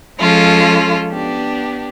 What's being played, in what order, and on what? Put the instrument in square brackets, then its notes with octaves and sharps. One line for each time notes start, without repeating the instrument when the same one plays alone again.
[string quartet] F3 G#3 C#4 F4 A4
B3 D4 G4